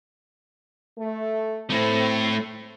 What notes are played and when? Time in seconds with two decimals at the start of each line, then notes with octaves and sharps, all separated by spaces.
0.98 A3
1.70 A3 C4 E4